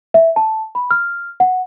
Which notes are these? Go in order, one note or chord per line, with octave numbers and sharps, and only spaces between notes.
E5
A5
B5
F6
F#5